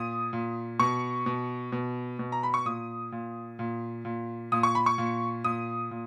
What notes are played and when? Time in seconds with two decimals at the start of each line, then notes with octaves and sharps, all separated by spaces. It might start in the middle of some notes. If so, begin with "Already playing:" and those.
Already playing: A#2 D#6
0.33 A#2
0.79 B2 C#6
1.26 B2
1.72 B2
2.19 B2
2.32 A#5
2.43 B5
2.54 C#6
2.65 A#2 D#6
3.12 A#2
3.59 A#2
4.05 A#2
4.52 A#2 D#6
4.63 C#6
4.75 B5
4.86 C#6
4.98 A#2
5.44 A#2 D#6
5.91 A#2